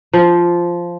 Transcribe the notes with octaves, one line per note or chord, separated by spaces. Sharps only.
F3